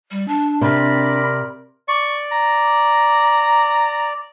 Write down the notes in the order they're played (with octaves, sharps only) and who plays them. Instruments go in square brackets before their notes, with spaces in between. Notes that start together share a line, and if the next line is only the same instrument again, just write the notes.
[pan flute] G3
[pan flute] D4 [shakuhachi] A5
[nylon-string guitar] C3 [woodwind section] C4 A#4 D5 [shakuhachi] B5
[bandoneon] D5 [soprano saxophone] C#6
[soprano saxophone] A#5